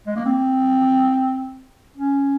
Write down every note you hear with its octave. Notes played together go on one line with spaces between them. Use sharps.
G#3
A#3
C4
C#4